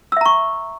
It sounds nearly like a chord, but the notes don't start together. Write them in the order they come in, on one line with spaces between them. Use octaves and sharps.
E6 E5 A#5 C#6